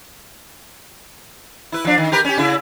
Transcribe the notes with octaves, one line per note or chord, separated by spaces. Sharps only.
E4 B4
F3 D4
D#3
G4 A#4 B4
C#4 G4
C#3 E4